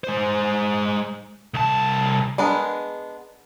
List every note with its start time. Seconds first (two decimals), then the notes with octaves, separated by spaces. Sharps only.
0.04 G#3 C5
1.54 C2 A5
2.38 G#3 B3 D4 G#4 A#4